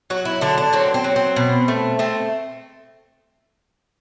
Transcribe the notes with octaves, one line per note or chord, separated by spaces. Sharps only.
F#3 F#4
E4
D3 D4
D4
F#3 C4
C4
F#3
C4
B2
A3
A3 C4